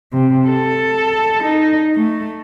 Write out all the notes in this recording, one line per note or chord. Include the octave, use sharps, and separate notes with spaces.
C3
A4
D#4
A3